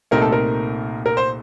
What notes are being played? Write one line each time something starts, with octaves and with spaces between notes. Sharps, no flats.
C2 A#2 A3 C4 D#4 A#4
A4
A#4
A#4
C5